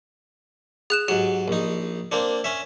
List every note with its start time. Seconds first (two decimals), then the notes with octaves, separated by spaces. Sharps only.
0.90 G#4 F#6 E7
1.08 G#2 F#3 G4
1.48 A#1 D#4
2.12 A#3 C4 D4
2.44 C#4 E5